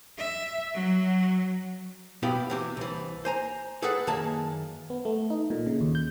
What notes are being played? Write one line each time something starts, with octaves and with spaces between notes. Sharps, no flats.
E5
F#3
F#2 B2 B3 E4 G4 F5
C3 E3 G4
C2 E3
C5 G#5 A#5
G#4 A4 B4 F#5
F#2 D#3 A#3 G#4 A5
B3
A3
D#4
A#2
C#3
D#2
G6